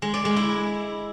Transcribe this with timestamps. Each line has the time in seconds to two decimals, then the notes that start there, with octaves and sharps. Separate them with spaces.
0.02 G#3
0.14 D5
0.25 G#3
0.36 E4